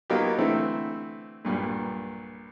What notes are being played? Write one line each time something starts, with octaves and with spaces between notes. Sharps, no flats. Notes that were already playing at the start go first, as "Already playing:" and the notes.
F#3 A#3 B3 D#4 F4 G4
D3 E3 A3 C4 E4
B1 G2 A#2